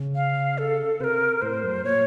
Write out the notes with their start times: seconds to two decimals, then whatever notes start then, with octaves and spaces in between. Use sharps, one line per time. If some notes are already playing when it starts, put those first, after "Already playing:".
Already playing: C#3
0.15 F5
0.58 A4
1.00 C3 C5
1.04 A#4
1.42 A2 C5
1.63 F#2
1.84 A#2 C#5